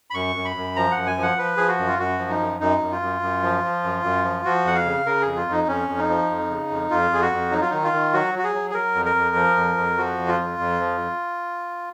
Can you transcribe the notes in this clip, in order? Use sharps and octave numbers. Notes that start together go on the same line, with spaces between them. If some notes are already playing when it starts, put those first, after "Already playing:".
B5
F#2 C#6
F#2
B5
F#2
F3 A#5
F#5
F#2
G#5
F3
F#5
F3 B4
F3 G#4
F#4
F#2
F4
F#2 F#4
F3
D#4
F#2
F#2 D#4
F#2
F4
F#2
F#2
F3
F3
F#2
F#2
F3
F3 F#4
F2 F#5
F5
C#3
C#3 A#4
F2 G#4
F4
F2 D#4
F2 C#4
F2
D#4
F3
F2
C#3
F2
F2 F4
F2 G#4
F#4
F2
F#3 D#4
F4
D#3 D#4
F4
D#3
F#3 F#4
F#3 F#4
G#4
F#3
G#4
F#3 A#4
F2
A#4
F2
F3
F2
F2
F3 F#4
F2
F4
F2
F2
F3